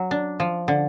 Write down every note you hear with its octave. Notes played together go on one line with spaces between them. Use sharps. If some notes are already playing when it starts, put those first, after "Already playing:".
Already playing: F#3
D4
F3
D3